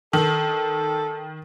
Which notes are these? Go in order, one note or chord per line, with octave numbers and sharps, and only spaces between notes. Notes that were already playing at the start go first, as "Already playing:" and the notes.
D#3 A4